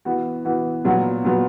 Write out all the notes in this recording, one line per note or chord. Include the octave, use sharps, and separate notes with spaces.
E3 B3 F#4
E3 B3 F#4
A#2 F#3 B3 F#4
A#2 F#3 B3 F#4